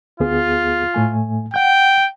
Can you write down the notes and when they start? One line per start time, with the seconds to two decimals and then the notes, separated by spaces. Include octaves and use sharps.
0.20 D2 B3 F4 G#4
0.94 A2 A3 G#5
1.54 F#5 G5 G6